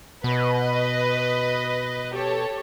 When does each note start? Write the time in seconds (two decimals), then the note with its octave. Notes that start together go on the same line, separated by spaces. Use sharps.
0.24 B2 B4 D#5
2.13 G4 A4 C#5